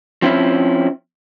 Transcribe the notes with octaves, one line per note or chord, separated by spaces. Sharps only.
F3 C4 C#4 E4